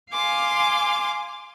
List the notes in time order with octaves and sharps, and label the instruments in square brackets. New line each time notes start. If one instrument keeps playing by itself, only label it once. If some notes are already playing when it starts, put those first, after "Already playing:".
[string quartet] F5 G#5 C6 D6